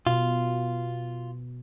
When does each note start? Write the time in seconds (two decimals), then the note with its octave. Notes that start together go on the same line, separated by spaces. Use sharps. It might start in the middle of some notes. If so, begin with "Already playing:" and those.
0.07 B2 F4